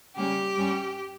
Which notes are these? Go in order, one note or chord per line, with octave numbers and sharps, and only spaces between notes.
C#3 G3 A#3 C#4 G4
G2 G3 C#4